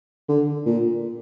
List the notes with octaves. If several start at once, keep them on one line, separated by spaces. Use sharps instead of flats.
D3
A#2